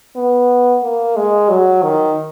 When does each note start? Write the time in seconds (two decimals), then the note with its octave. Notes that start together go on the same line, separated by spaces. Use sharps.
0.16 B3
0.83 A#3
1.16 G#3
1.50 F#3
1.83 D#3